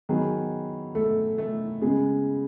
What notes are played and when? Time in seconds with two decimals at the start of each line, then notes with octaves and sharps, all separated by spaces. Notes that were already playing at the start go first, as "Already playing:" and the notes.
0.09 D#3 F#3 B3 G#4
0.95 A3 A4
1.38 A3 A4
1.82 C#3 G#3 B3 G#4